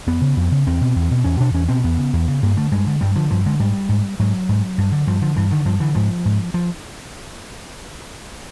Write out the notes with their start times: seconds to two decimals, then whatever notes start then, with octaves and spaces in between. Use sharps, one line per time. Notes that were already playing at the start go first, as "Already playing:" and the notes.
0.07 F2 B3
0.21 C#3
0.37 F2
0.51 C#3
0.67 E2 C4
0.81 B2
0.96 E2
1.11 B2
1.24 E2 C#4
1.40 B2 D4
1.54 E2 C#4
1.68 B2 C4
1.84 E2 B3
1.98 C#3
2.13 E2
2.28 C#3
2.43 G2 A#3
2.57 D3 A3
2.72 G2 G#3
2.87 D3
3.01 G2 G3
3.16 D3 F3
3.31 G2 F3
3.46 D3 G#3
3.59 G#2 G3
3.89 G#2
4.19 G#2 F#3
4.49 G#2
4.78 G2
4.92 D3
5.07 G2 F3
5.22 D3 F3
5.36 G2 E3
5.51 D3 D#3
5.65 G2 F3
5.80 D3 E3
5.95 G#2 F3
6.25 G#2
6.54 F3